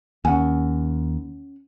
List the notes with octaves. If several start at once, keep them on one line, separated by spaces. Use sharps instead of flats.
D#2 C#4 F#5 G#5